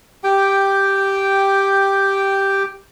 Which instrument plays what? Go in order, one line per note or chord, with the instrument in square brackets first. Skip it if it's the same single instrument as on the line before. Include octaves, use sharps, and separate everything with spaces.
[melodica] G4 G5